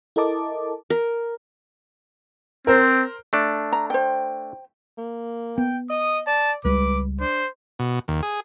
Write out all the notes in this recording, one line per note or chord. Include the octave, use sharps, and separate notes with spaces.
E4 A4 A#4 D#5 A5 D6
A#4
C4 A#4 C5
A3 D4
A#5
C5 G5
A#3
B3 G5
D#5 D#6
D5 A5
C#2 G3 G#3 B4 D6
D4 C5
B2
D#2
G#4